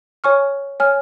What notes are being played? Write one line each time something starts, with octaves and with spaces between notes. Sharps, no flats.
C#5 G#5 C#6 F6
C#5 G#5 F6